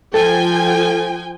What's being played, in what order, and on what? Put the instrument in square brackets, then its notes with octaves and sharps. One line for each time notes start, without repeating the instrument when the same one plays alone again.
[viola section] F3 G5 G#5 [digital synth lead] A4